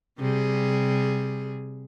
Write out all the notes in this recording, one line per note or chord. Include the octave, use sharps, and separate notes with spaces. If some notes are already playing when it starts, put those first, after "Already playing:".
C3 G3 G#4